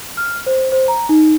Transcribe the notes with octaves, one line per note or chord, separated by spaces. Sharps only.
F6
C5
C5
A#5
D#4